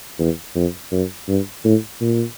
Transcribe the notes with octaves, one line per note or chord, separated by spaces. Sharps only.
E2
F2
F#2
G2
A2
A#2